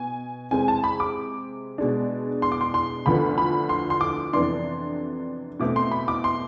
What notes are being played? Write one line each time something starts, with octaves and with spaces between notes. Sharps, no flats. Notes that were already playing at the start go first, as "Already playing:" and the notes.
Already playing: B2 G#5
C3 G#3 C4 G#5
A5
B5
D6
B2 G#3 D4
C6
D6
C6
C6
D2 D3 F3 B3 B5
B5
C6
C6
D6
F2 C3 E3 B3 D4 C6
B2 A3 C4 D6
C6
B5
D6
C6